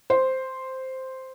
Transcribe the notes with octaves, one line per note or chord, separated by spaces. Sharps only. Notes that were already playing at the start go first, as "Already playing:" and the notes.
C5